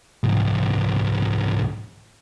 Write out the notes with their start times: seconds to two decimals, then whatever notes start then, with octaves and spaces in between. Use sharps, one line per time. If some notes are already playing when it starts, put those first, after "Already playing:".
0.24 C2 G#2